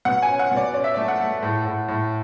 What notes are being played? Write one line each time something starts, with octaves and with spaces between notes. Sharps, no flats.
B2 F#5
G#5
C#4
F#5
B2
D5
C#4 D5
E5
A3 D5
F#5
A3
A2
A2
A2